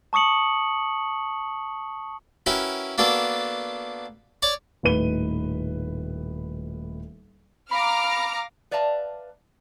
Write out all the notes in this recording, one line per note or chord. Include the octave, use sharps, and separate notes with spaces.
A5 C#6 D#6 C#7 F#7
C#4 E4 F#4 A#4 B4 G5
A#3 B3 D4 F#4 A4 B4
C#5 D5 C#6 D6
D#1 A2 D#4 B4 D#7 G7
F5 A#5 B5 D6 F6 A#6
B4 D5 E5 F5 A5 A#5